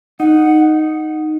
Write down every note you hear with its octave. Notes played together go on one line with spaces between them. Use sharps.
D#4 F#5